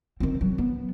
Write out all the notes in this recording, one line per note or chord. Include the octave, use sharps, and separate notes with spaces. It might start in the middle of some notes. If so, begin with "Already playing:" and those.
D#3 C4
F#3
B3